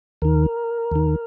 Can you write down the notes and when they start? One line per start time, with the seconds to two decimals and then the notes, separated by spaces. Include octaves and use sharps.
0.22 D#2 D#3 A#4
0.91 D#2 D#3